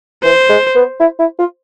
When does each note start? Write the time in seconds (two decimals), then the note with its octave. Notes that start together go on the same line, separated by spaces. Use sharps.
0.23 E3 C5
0.49 G#3
0.75 B3
1.00 E4
1.19 E4
1.38 F4